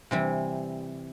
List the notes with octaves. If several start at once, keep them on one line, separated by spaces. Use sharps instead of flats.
C3 E3 G3